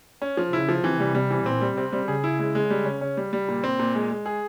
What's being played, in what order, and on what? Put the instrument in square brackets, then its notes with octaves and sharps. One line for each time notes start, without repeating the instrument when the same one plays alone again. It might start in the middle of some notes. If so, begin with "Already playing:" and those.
[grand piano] C#4
F3
[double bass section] C#3 [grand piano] E4
[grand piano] F3
[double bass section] C3 [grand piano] E3
[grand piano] G3
G3
E3
[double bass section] A#2 [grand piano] C4
[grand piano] G3
[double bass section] C3 [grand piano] C4
[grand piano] G3
[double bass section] C#3 [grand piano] G#4
[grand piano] E4
G#3
G#3
G3
C#4
C#4
G3
G3
A#2
C4
A#2
G#3
G#3
G#4